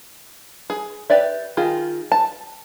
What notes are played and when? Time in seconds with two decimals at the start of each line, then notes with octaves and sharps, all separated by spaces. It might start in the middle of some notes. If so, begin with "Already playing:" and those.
0.70 G#4
1.10 G4 B4 D5 E5
1.57 D#3 F4 G#4
2.12 A5